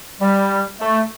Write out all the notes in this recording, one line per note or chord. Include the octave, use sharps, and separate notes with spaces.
G3
A3